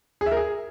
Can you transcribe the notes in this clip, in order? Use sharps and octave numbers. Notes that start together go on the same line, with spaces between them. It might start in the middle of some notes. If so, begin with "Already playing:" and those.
G#4
E5
A#4
G#4